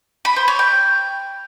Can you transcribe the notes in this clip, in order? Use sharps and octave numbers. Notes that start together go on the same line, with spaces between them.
B5
C5
C#5
G5